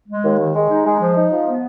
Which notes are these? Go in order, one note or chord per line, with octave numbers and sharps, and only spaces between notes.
G#3
D#2
D#3
G#3
D#4
G#3
F3
D#4
F3
B3